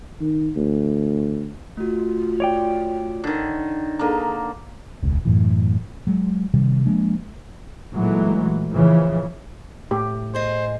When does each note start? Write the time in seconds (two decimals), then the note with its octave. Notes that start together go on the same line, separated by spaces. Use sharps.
0.20 D#3
0.56 D2
1.77 A3 F4 F#4
2.40 C#5 D5 G5
3.24 D3 D#3
3.99 D3 A#3 G#4 A4 A#5
5.02 E1 C#2 C#3
5.25 F#2 A2 E3
6.07 F#3 G#3
6.54 C3 D#3 G3
6.86 F3 G#3 A#3 D4
7.94 A#2 E3 F#3 G#3 A3
8.72 C#3 E3 F3
9.91 A2 G4
10.35 G#4 C5 D#5